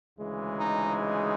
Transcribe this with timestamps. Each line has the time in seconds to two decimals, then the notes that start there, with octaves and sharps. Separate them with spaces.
0.18 D2 C#3 E3 G#3
0.58 D#4
0.99 D#4